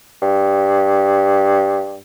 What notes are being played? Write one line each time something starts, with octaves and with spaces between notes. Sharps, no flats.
G2